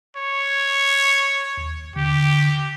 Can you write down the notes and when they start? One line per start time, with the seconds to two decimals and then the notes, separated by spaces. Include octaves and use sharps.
0.16 C#5
1.57 D#2
1.96 D3 G4